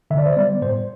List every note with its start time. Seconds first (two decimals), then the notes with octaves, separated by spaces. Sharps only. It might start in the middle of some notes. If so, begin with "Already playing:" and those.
0.10 D3 E5
0.18 D5
0.26 C5
0.33 D5
0.36 G3 B3
0.62 A2 C5